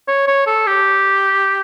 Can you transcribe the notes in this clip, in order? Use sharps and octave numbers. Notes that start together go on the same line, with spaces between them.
C#5
C#5
A4
G4